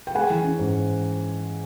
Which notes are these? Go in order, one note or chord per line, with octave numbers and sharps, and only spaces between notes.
G5
G#3 F#5 G#5
E3
C#4
G#2